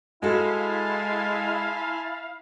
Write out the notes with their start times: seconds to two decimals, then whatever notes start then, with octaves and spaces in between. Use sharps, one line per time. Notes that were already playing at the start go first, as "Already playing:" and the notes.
0.23 G#3 E4 F#4 A4 F5 G#5 A5 C6